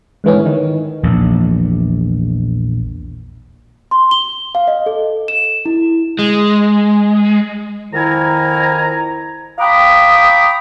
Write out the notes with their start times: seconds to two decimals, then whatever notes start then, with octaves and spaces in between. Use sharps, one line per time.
0.24 G#2 D3 E3 B3 C#4
0.46 D#3
1.03 A#1 E2 A#2
3.91 C6
4.11 G7
4.55 F5
4.68 D#5
4.86 A4
5.28 E7
5.66 E4
6.19 G#3
7.93 F2 D#3 E4 G#5 A#5
9.59 F5 G5 A#5 B5 D6 D#6